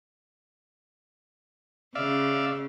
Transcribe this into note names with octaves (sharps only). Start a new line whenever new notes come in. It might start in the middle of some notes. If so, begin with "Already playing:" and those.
C#3 D5 E5 F5